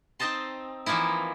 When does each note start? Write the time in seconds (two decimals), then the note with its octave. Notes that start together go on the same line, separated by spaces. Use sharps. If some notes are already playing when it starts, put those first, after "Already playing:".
0.20 C4 D#4 C5 D#5 A5 C6
0.86 E3 F3 A#3 D#4 E4